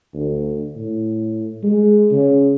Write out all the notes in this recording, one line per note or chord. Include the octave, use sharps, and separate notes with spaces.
D2
A2
G#3
C#3